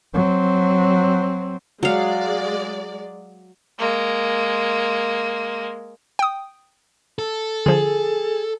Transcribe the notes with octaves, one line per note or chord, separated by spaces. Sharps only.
F#3 C4
F#3 G#3 D5 F5
G#3 A#3
G5 D#6
A4
D3 F3 G#4